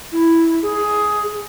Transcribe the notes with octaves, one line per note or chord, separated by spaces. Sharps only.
E4
G#4